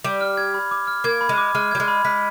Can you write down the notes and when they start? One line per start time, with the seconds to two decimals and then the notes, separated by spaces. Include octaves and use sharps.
0.04 G3 D6
0.21 F6
0.37 G#6
0.54 B5
0.71 D6
0.87 F6
1.04 A#3 G#6
1.21 B5
1.29 G#3
1.38 D6
1.55 G#3 F6
1.71 G3 G#6
1.80 G#3
1.88 B5
2.04 G#3 B6